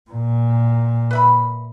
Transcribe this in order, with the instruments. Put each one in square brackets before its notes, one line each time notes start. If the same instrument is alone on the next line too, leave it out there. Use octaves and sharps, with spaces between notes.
[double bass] A#2
[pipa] B4 E5 B5